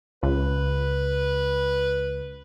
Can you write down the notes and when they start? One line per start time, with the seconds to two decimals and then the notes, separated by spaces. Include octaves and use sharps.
0.23 C#2 B4